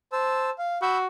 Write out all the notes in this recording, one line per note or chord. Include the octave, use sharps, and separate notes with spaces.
C5 A5 E6
F5
F#4 B5 E6 G6